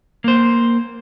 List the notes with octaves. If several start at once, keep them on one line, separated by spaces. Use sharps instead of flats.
A#3 C5